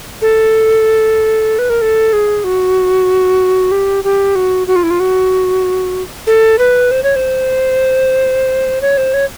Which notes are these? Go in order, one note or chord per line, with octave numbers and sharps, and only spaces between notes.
A4
B4
A#4
A4
G#4
F#4
G4
G4
F#4
F#4
F4
E4
F4
F#4
A4
B4
C5
C#5
C5
C#5
C5
C#5